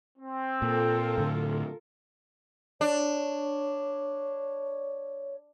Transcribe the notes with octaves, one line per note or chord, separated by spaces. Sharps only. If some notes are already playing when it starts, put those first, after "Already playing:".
C4
A#2 F4 A4 A#4
A2 D3
D4 C#5